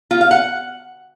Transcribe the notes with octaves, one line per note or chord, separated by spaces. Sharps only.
F4
F5
F#5